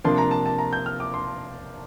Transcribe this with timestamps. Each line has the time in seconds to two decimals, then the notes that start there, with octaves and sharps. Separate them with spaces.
0.04 C3 F3 A#3 D4 C6
0.18 A#5
0.31 A5
0.46 A5
0.58 A#5
0.73 G6
0.86 F6
1.00 D6
1.14 C6